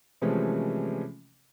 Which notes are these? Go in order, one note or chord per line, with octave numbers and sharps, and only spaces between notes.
C3 E3 F3 G#3 A3 C#4